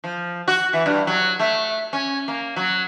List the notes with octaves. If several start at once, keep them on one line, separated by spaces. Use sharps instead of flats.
F3
F#4
E3
G2
F#3
A3
C#4
A#3
F#3